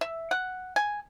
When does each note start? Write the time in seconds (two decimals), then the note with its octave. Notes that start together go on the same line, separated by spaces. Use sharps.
0.01 E5
0.31 F#5
0.76 G#5